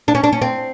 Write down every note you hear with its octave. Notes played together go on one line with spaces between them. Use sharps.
D4
C#4
D4
C#4
C4